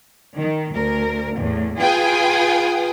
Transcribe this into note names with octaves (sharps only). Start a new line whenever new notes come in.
D#3
D2 A#4
E2 A2
F4 G#4 B4 G5 G#5 D#6